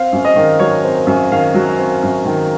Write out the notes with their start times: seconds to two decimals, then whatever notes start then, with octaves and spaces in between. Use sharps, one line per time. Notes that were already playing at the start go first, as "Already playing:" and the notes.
Already playing: C4 F5
0.12 F#2
0.25 D#5
0.36 D#3
0.59 F#3 C#5
0.83 C4
1.07 F#2
1.31 D#3 F5
1.54 F#3
1.78 C4
2.03 F#2
2.26 D#3